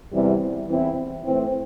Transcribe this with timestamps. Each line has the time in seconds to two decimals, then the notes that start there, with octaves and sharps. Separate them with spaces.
0.12 E2 C3 E3 G3
0.69 E2 E3 C4 E4
1.25 A2 E3 C4